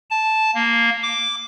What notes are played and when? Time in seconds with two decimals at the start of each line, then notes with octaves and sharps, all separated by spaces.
0.10 A5
0.55 A#3
1.03 D6